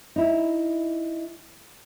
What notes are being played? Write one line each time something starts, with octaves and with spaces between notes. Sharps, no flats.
D#4 E4